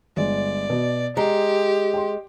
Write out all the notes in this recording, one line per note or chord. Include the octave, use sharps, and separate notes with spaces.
G1 G#3 D5
B2
G#3 G4 A#5
G5 C6